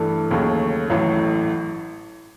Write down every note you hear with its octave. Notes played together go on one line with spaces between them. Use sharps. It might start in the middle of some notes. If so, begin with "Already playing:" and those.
Already playing: G2 E3 A3
D#2 C#3 F#3 A3
A1 A2 F#3